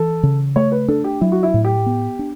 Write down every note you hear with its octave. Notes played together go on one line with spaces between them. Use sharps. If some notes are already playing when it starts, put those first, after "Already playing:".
Already playing: E3 A4
C#3
A3 C#5
B4
D4 A4
G4
F#3 E4
F#4
E4
A2
G4
B3
D4